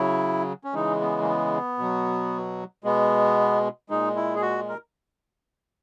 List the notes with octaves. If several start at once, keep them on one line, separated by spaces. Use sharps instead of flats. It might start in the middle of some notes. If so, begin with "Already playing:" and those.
Already playing: C#3 F#3 E4
C#4
C#3 E3 G#3 D#4
B3
A#3
B3
B2 F#3
B2 G#3 B3
A#2 G#3 D#4
E4
G#4
F#4
A#4